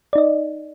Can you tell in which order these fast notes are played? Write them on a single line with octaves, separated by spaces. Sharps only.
D5 D#4 D#5